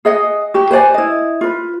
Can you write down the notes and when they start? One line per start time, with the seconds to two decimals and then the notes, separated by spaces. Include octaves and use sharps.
0.05 G#4 D#5 F#5
0.54 F#4 G4
0.71 B4 C5 D5 G#5
0.94 E4 D#5
1.41 F4 B4